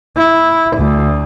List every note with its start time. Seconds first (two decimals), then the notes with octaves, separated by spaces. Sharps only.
0.16 E4
0.75 D2